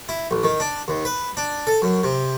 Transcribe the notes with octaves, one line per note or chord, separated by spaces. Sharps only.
E4
A1
D#3
D4
D#2
B4
D4
A4
F#2
C3